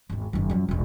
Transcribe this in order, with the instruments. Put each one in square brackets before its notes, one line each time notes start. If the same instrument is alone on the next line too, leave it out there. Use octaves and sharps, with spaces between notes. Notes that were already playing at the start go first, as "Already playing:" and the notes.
[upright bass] G#1 E2
F#1 D#3
F#2 F3
E1 A#1